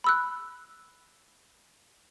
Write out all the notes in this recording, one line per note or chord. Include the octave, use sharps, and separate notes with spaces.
B5 E6 F#6